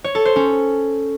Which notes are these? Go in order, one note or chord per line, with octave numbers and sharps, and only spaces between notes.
C#5
A4
C5
C#4